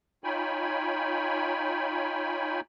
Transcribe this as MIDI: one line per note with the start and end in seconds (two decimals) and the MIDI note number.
0.24 2.61 63
0.24 2.61 65
0.24 2.61 73
0.24 2.61 79
0.24 2.61 80
0.24 2.61 83